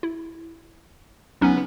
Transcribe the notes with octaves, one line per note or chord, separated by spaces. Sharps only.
E4
C#2 F#3 B3 C#4 D#4